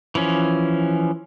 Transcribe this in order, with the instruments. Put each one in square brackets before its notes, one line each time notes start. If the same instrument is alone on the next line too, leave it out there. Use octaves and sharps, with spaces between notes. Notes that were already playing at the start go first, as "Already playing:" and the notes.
[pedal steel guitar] E3 F3 C#4